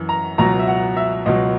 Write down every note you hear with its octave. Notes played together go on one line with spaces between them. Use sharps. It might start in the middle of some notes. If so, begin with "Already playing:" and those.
Already playing: F#2 E3
A#5
C#2 B2 F#3 A#5
E5
F#5
E5
C#2 B2 F#3 D#5